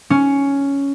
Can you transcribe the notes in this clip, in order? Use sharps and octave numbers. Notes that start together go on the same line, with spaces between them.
C#4